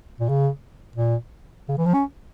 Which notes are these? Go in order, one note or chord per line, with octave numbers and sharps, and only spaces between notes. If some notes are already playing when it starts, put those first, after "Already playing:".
A#2
C#3
A#2
C#3
E3
F3
C#4